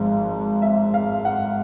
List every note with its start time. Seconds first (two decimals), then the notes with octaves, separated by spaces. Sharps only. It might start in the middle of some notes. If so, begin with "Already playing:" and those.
Already playing: G#1 G#2 F3 G#3
0.62 E5
0.94 F5
1.25 F#5